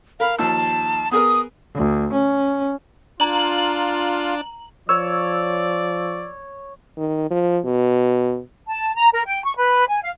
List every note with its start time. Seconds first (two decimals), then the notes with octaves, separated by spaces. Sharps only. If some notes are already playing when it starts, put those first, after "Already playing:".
0.20 A#4 F5 B5
0.39 D#2 F3 A5 E6
1.11 B3 G#4 A#4 D#6
1.75 D2
2.13 C#4
3.20 D4 F4 A#5 F#7
4.89 F3 C#5 D5 E6
6.98 D#3
7.31 F3
7.65 B2
8.67 A5
8.95 A#5
9.12 A#4
9.26 G5
9.45 C#6
9.57 B4
9.87 G#5
10.03 F5